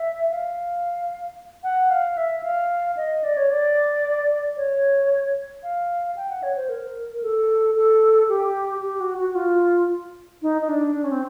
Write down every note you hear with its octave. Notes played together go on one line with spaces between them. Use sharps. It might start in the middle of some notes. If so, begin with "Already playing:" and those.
Already playing: E5
F5
F#5
F5
E5
F5
D#5
D5
C#5
D5
C#5
F5
G5
F#5
C#5
C5
A#4
A4
A4
G4
G4
F#4
F#4
F4
D#4
D#4
D4
D4
C#4
C4